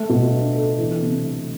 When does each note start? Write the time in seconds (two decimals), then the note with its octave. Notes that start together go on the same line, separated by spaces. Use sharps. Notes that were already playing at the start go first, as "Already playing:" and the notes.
Already playing: A3
0.09 B2
0.32 D4
0.56 A4
0.79 E3
1.02 C3
1.24 A3